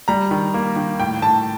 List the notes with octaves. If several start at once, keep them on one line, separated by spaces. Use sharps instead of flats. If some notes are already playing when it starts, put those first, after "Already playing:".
G3 A#5
D#3
A#3
D#3
A2 G5
A2 A5